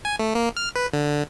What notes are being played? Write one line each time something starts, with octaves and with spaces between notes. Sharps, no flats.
G#5
A3
A#3
F6
B4
D3